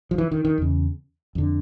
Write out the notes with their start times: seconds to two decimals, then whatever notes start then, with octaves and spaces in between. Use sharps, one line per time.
0.11 F3
0.18 E3
0.31 D#3
0.45 D#3
0.58 E2 C#3
1.35 F2 D3